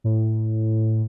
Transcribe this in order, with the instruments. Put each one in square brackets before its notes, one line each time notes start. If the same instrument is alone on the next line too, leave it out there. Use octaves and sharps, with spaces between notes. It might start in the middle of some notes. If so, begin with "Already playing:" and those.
[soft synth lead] A2